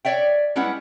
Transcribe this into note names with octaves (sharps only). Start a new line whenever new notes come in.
C#5 D5 E5 G5
G3 G#3 C#4 E4 B4 F#5